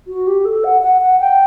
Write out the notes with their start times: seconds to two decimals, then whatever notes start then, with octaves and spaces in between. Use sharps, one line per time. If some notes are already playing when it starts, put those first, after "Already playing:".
0.08 F#4
0.27 G4
0.45 A4
0.64 F#5
0.82 F#5
1.02 F#5
1.20 G5